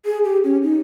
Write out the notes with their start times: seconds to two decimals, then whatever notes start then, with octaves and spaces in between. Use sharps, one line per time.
0.05 G#4
0.25 G4
0.44 C#4
0.63 D#4